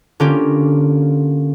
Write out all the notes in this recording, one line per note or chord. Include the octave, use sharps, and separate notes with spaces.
D3 A#3 C#4 F4 G4